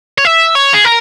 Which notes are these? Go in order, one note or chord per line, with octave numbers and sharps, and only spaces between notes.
C#5
E5
C#5
G#4
A#4